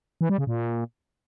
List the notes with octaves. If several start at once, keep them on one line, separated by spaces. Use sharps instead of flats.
E3
G3
C#3
A#2